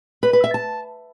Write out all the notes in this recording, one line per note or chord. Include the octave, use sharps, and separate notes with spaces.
B4
B4
E5
A5